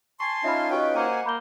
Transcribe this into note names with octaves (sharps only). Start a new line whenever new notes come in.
G#5 A5 C6 C#6
C#4 D#4 F4 E5 B5
F#4 G4 B4 C#5 D#5 G5
A#3 C5 F#5 G#5
A#3 B5 G6 G7